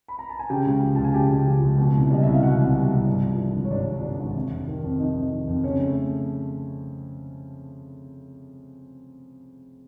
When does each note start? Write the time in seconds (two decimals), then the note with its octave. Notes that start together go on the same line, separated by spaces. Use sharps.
0.08 B5
0.19 A#5
0.29 A5
0.39 G#5
0.50 C#3 G4 G5
0.66 C#2
0.82 F3
0.95 C#2 A5
1.04 G#5
1.14 C#3 G4 G5
1.30 C#2
1.47 F3
1.63 C#2
1.78 B2
1.94 C2
2.11 G3 D#5
2.23 C2 E5
2.33 F5
2.42 B2 F#4 F#5
2.59 C2
2.75 G3
2.91 C2
3.07 G2
3.23 F3
3.39 D3
3.55 G#1
3.65 C#5
3.71 G2 D4 D5
3.87 F3
4.04 D3
4.19 G#1
4.35 C3
4.52 F2
4.68 D#3
4.84 F2
5.00 C3 D#4 D#5
5.16 F2
5.32 D#3
5.48 F2
5.64 C#3 C#4 C#5
5.80 A3